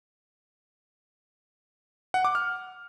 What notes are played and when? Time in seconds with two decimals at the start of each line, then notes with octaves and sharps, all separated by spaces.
2.14 F#5
2.25 D6
2.35 F6